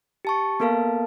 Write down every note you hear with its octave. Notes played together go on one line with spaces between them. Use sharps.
G4 A5 C#6
A#3 B3 A4 A#4 F5 A5